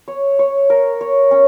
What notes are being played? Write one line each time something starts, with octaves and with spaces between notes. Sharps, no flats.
C#5
C#5
A#4
C#5
C#4